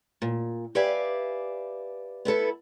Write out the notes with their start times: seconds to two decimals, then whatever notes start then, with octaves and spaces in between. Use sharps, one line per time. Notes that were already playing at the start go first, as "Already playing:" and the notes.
0.22 A#2
0.75 G4 B4 D5 E5 F5 G#5
2.25 B3 E4 A4 B4